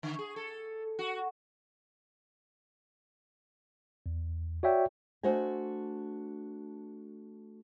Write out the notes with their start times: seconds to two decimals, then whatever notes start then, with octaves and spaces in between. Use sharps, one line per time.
0.03 D3
0.19 G#4
0.36 A4
0.99 F#4
4.06 E2
4.63 F#4 C#5 D5 E5 G5
5.23 A3 D4 F#4 C5 D#5 G#5